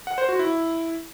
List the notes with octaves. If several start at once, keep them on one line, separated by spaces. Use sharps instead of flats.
F#5
C5
F#4
E4